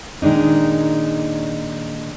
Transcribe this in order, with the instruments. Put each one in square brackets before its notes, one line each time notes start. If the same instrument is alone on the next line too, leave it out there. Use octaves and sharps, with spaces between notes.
[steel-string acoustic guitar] A#2 D#3 G#3 D4 D#4